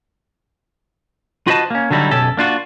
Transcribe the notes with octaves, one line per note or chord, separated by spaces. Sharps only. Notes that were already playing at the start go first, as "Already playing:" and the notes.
F4 F#4 B4 C5 D#5 A5
A#3 C#4
D3 F#3 G3 D#4 E4
B1 F#2 C#4 G4 A4
A#3 D4 F4 F#4